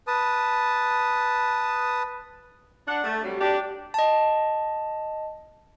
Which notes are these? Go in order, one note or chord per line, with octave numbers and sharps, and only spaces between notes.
B4 A5 D#6
D4 F#5
A3
C3 F#3 G3
D4 G4
D#5 A5